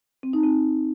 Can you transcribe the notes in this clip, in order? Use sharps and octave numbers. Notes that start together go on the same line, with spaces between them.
C4
D#4
C4